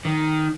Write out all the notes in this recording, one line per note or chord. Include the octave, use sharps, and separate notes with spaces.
D#3